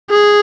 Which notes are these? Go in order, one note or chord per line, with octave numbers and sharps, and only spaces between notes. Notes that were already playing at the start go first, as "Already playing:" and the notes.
G#4